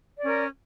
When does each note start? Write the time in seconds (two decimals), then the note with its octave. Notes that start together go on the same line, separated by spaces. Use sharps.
0.17 D5
0.21 C#4
0.25 A#4